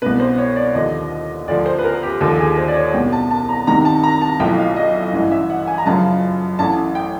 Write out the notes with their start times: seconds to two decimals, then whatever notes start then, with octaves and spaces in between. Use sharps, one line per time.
0.02 C2 B2 B4
0.20 C5
0.38 C#5
0.56 D5
0.74 D#2 D3 F3 D#5
1.47 D2 D3 F3 D5
1.66 C5
1.78 B4
1.84 A#4
2.03 G4
2.21 D#2 D3 F3 A4
2.39 G#4
2.57 C5
2.68 D5
2.76 C#5
2.93 C2 B2 G5
3.12 A5
3.31 A5
3.49 A#5
3.67 C2 C3 D#3 A#5
3.85 A5
4.03 A#5
4.22 A5
4.40 B1 A2 F3 G5
4.58 F5
4.76 D#5
4.95 E5
5.13 A1 G2 E3 D#5
5.32 E5
5.50 F#5
5.68 G#5
5.78 A#5
5.86 F#1 F#2 C#3 F3 A5
6.59 A1 A2 E3 A5
6.95 G5